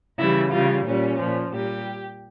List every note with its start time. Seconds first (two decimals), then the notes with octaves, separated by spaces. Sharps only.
0.18 C#3 E3 G3 E4
0.51 C#3 G3 F4
0.86 A#2 G3 C#4
1.19 A#2 F3
1.53 A#2 G3 G4